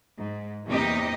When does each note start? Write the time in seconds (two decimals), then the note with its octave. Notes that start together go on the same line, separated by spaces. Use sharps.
0.19 G#2
0.67 E2 C3 A#3 D#4 G4 D#5